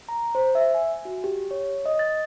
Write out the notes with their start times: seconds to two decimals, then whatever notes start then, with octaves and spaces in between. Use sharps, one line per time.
0.09 A#5
0.35 C5
0.55 E5
0.74 G#5
1.05 F#4
1.24 G4
1.51 C#5
1.86 D#5
1.99 A6